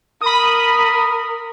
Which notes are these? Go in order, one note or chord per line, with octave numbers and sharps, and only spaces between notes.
A#4 B5 D#6